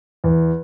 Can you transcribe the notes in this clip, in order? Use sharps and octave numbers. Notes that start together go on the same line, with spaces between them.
E2